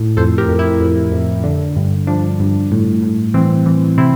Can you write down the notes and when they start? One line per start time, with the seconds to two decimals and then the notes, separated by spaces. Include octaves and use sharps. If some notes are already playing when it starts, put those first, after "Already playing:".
Already playing: A2
0.17 F2 A4 C5
0.38 G4 A#4
0.48 F2
0.59 E4 G4
0.80 F2
1.12 F2
1.44 D3
1.76 G2
2.07 F3 D4
2.39 G2
2.71 A2
3.02 A2
3.34 E3 C4
3.66 E3
3.98 C3 C4 E4